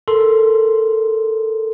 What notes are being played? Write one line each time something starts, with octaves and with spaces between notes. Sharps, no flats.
A4 A#4 C6